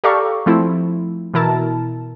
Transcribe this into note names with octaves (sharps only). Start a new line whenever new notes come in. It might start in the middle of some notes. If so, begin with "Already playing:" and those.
G4 A4 D5 F5 A#5 C#6
F3 A3 C4 E4
B2 E3 E4 A#4 A5